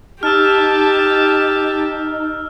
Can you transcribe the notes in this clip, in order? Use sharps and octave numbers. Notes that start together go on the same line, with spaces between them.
D#4 G4 A5 E6 F6